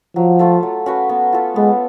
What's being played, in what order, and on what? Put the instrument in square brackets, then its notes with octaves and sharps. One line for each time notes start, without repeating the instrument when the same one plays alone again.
[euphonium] F3 [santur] F#3
[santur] A3 F4 A4
F#3
C#4 F#4 B4
B3
F4 A4
[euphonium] G#3 [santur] B3